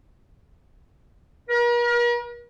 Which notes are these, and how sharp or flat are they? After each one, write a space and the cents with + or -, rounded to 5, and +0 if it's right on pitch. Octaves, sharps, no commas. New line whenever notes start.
A#4 +45